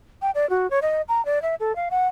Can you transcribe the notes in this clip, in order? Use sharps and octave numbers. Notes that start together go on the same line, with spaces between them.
G5
D5
F#4
C#5
D#5
A#5
D5
E5
A4
F5
F#5